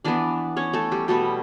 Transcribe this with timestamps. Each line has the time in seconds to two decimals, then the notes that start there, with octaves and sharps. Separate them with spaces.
0.04 E3 B3 D4 D5
0.56 C#4 C#5
0.73 A3 A4
0.92 G3 G4
1.08 B2 G3 A3 B3 A4